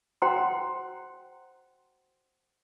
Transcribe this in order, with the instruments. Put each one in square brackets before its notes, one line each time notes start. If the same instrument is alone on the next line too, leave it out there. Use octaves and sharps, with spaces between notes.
[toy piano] F#4 C5 F#5 G5 A#5 C6